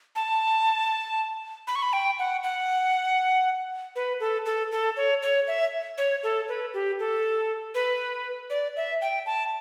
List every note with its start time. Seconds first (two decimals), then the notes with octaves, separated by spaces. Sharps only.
0.16 A5
1.67 B5
1.76 C#6
1.82 B5
1.93 G5
2.19 F#5
2.43 F#5
3.96 B4
4.20 A4
4.46 A4
4.72 A4
4.97 C#5
5.22 C#5
5.47 E5
5.98 C#5
6.23 A4
6.48 B4
6.74 G4
6.99 A4
7.75 B4
8.50 D5
8.77 E5
9.02 G5
9.26 A5